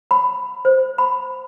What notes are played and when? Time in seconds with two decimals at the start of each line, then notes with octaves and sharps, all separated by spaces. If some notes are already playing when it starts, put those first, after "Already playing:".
0.11 B5
0.65 C5
0.98 B5